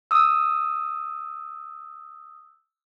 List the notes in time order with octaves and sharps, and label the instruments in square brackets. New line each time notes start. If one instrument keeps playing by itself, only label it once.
[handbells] D#6 E6